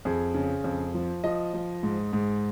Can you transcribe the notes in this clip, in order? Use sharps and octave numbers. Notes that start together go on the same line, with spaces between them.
F2 G#4
C#3
F2
F3
F3 D#5
F3
G#2
G#2